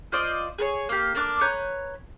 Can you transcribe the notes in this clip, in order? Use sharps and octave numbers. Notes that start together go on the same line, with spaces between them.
F4 C5 D5 D#5
G#4 B4 C#5
A#3 G4
A#3 D4 D6 F#6
B4 C#5 A#5 G6